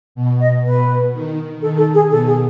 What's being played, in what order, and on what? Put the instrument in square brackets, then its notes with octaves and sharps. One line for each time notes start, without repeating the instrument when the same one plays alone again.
[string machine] B2
[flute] D#5
[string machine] B2 [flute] B4
[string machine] D#3
[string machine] D#3 [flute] A4
[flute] A4
G#4
[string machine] B2 [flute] A4
[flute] G#4